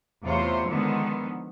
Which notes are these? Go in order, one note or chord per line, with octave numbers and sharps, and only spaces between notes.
E2 C3 A3 F4 C5 C#5
D3 D#3 F3 G#3 B3